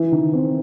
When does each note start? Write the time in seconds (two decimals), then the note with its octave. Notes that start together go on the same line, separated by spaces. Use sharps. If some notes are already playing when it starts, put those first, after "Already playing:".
Already playing: E3 E4
0.11 D#3 D#4
0.33 C4